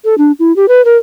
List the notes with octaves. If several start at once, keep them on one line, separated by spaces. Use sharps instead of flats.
A4
D4
E4
G4
B4
A#4